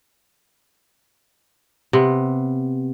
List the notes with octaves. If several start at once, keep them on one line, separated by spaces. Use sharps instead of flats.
C3 B3